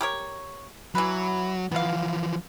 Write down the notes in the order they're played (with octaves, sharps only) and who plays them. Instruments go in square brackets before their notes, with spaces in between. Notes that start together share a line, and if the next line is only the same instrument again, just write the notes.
[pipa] G4 A#4 C#5
[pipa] E3 B4 [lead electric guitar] F#3
[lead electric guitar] E3 F3 [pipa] B3 F5